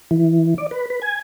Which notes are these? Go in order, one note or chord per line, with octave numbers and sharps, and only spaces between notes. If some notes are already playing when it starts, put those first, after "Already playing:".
E3
D5
B4
B4
G#5